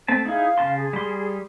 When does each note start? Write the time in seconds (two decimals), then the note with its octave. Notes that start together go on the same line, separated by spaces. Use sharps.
0.08 A3 C4 A5
0.25 D#4 E4 G#4 F5
0.58 C#3 A5 C6
0.75 G#4
0.93 G3 C6